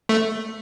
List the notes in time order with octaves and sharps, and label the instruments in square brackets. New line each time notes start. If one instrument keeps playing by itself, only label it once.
[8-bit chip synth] A3